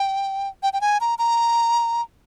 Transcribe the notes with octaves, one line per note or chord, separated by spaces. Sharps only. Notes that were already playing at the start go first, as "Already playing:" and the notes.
Already playing: G5
G5
G5
G#5
A#5
A#5